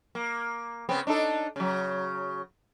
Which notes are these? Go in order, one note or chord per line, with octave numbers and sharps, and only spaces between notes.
A#3
C#3 B3 C4
D4 D#4 A4
C#3 F#3